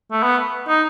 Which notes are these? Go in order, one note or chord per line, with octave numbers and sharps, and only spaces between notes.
A3
B3
D#4